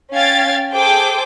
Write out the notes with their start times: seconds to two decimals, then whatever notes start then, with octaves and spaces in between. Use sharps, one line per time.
0.13 C#4 F5 G5 G#6 A6
0.73 G#4 A4 C5 G5 D6